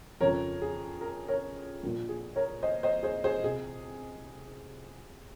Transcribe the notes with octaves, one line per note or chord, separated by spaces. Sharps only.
F2 C#3 F3 A#4 C#5
G#4
A#4
A#4 C#5
A#1 A#2 F3 A#3
G#4
A#4 C#5
C5 D#5
C5 D#5
G#4 C5
G#4 C5
C3 G#4